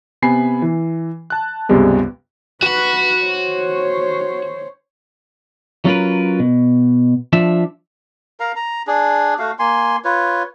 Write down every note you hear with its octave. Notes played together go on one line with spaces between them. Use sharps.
C3 B3 G#5 B5 C7
E3
A5 F#6
C#2 G2 C3 G3 G#3 B3
F#4 B4 F#5
C5 C#5
F#3 C#4 F4 G#4 A#4 B4
B2
F3 D4 E5
A#4 F5 A#5
A#5
D4 G#4
A3 F#4 F5
A#3 G#5 C6
F4 B4 C#5